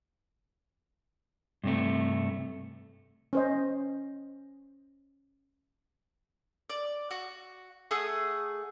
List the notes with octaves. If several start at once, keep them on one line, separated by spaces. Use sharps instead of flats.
G2 C3 A3
C#4 C5 D#5
D5
F#4
A3 G#4 F#5 D#6